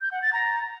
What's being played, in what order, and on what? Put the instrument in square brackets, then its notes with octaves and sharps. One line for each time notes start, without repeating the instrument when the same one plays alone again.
[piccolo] G6
F#5
A6
A#5